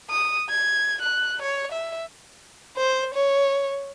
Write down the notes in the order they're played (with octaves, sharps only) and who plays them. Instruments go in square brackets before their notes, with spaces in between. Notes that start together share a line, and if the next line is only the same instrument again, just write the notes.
[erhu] D#6
G#6
F#6
C#5
E5
[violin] C5
C#5